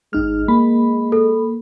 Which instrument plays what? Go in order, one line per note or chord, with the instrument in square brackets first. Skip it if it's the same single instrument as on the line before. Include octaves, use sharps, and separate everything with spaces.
[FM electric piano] G#1 D#4 F6 [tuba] G#3
[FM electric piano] A#3 B5
[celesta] A4